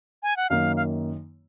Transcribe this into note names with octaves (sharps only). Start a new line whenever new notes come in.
G#5
F#5
F#2 D#3 A#3 F5
F5